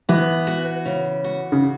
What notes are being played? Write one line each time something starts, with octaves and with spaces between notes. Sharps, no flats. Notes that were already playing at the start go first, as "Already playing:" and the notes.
E3 B3
F#4
C#3
F#4
C#3